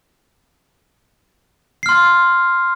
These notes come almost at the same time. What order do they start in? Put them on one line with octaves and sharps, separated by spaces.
C7 F6 C6